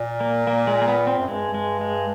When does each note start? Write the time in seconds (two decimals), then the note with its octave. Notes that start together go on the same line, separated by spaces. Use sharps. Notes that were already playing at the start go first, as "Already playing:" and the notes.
Already playing: A#2
0.20 A#3
0.47 A#3
0.67 G#3
0.81 A#3
0.88 B3
1.07 C4
1.18 F#2
1.28 G2 G#3
1.54 G#3
1.81 G#3